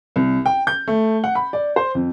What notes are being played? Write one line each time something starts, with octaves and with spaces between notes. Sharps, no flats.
C2
G5
G6
A3
F#5
B5
D5
C5
F2